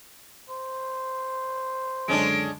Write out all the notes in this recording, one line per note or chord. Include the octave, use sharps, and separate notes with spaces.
C5
C#2 F#2 D3 G#3 C#4 D4 D7